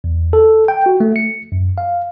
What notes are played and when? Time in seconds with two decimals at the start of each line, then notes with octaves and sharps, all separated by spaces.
0.04 E2
0.33 A4
0.68 G5
0.86 F#4
1.00 A3
1.16 C#7
1.52 F#2
1.78 F5